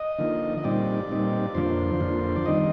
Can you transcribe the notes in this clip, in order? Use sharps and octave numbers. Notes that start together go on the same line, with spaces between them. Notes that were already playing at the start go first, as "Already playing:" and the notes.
Already playing: D#5
D3 F3 A#3 D#4
D#5
A#2 G3 C4 D#4 D5
A#2 G3 C4 D#4
F2 D3 F3 A#3 D4 C5
F2 D3 F3 A#3 D4
D5
D#3 G3 C4 D#4 D#5